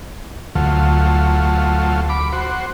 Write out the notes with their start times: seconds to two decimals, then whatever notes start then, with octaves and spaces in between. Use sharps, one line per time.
0.55 D2 F#3 A3 F4
2.09 B5 D6
2.33 F#4 C5